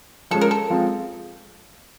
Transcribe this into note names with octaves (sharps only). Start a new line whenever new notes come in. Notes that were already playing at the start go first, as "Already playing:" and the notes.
F3 G#3 C#4 A4
A#4
A4
F3 G#3 C4 F4